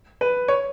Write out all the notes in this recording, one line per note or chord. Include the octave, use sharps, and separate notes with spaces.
B4
C#5